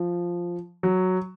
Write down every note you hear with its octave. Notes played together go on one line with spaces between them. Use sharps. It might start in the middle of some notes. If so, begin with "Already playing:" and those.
Already playing: F3
F#3